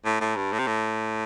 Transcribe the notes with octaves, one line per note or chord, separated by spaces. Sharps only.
A2
A2
G2
A2
C3
A2